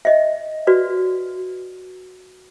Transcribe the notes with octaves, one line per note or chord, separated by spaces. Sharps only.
D#5 E5
F#4 B4 D5